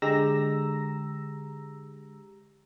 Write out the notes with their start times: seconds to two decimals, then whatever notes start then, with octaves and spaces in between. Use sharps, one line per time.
0.02 D3 G#3 G4 A#5 E6 A#6